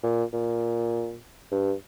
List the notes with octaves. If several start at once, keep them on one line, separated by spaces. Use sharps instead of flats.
A#2
A#2
G2